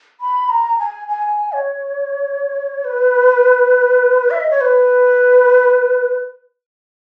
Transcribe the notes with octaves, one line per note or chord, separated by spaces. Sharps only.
B5
A#5
G#5
G#5
C#5
B4
E5
D#5
C#5
B4